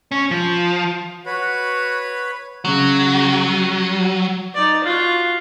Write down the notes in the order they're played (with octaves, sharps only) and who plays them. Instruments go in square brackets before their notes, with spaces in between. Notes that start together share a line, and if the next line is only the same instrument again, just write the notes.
[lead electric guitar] C#4
F3
[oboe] F#4 [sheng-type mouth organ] B4 C#5 B5
[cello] C#3 [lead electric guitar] F#3
[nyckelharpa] D#4 D5
F4 F#4